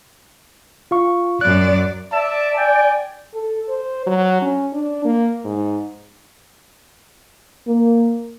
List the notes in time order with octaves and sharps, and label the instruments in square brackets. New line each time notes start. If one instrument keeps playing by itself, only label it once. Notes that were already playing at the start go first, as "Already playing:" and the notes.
[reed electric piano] F4 F5 C#6
[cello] F#2 D5 [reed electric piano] F#6
[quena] D5 [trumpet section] E5 A5
[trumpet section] G5 G#5
[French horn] A4
C5
F#3
C#4
D4
A#3
G#2
A#3